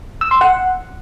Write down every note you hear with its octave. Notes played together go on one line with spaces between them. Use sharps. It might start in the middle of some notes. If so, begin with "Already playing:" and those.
E6
C6
F#5